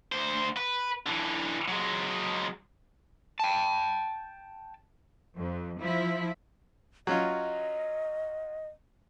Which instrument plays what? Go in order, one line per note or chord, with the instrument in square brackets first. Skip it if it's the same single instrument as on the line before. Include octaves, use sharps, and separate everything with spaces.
[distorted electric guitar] D2 C5
B4
D3 E3
F#3 G#3
[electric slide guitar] G5 A5
[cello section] F2
F3 E4
[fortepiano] F#3 C#4 F4 [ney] D#5